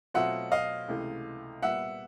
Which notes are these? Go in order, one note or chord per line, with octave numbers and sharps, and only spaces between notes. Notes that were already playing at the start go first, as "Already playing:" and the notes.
B2 F#3 A3 C4 F4 E5 F#5
D#5 F5
C#2 C3 E3 A3
A#2 G3 B3 E5 F#5